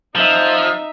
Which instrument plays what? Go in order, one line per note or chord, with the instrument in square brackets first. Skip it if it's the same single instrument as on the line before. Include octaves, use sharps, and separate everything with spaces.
[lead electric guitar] F3 [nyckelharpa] D#4 E5